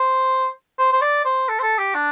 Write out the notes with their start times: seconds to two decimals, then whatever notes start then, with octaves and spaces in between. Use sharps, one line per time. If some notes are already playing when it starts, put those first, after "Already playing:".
Already playing: C5
0.79 C5
0.93 C5
1.01 D5
1.25 C5
1.49 A4
1.59 C5
1.63 A4
1.78 G4
1.94 D4